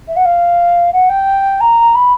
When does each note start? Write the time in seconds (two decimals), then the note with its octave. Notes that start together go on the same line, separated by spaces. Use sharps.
0.08 E5
0.16 F#5
0.25 F5
0.93 F#5
1.10 G5
1.61 A#5
1.95 B5